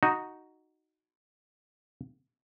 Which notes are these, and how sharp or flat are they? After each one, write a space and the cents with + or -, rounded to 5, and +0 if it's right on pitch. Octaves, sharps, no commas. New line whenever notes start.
D#4 +0 F#4 +0